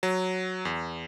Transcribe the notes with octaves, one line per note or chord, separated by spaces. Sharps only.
F#3
E2